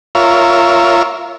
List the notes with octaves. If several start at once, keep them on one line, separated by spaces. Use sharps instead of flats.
F4 A#4 C#5 E5